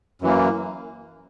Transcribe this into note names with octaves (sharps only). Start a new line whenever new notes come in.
F#2 E3 A#3